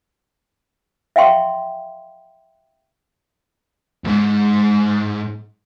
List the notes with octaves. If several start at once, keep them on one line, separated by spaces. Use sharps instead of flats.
E5 F5 G5 C6 C#6
D2 G#2